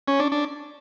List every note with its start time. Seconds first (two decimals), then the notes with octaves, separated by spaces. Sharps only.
0.08 C#4
0.20 D4
0.32 D4